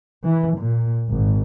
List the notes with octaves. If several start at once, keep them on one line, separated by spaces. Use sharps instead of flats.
E3
A#2
G#1